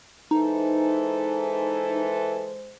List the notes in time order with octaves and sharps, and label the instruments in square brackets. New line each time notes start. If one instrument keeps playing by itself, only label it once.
[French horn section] E3 A4 [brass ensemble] G#3 C5 [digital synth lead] D#4